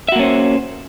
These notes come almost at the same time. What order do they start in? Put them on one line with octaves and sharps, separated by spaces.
E5 F#4 A#3 C#4 C5